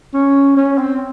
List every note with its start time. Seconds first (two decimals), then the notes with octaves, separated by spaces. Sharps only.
0.14 C#4
0.57 C#4
0.78 C4